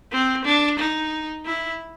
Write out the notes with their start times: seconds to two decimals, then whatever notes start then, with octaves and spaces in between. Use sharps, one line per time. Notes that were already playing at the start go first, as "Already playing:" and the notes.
0.12 C4
0.45 D4
0.79 D#4
1.46 E4